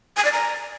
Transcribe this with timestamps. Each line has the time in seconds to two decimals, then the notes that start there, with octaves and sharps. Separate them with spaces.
0.17 G#5
0.25 D5
0.32 A#5